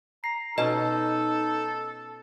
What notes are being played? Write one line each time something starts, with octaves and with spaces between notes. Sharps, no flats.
A#5 C7
B2 C#4 D#4 A4 D#5